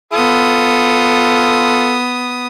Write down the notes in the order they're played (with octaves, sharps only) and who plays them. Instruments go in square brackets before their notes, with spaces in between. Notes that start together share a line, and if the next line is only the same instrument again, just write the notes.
[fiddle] B3 D#6 [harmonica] F4 A4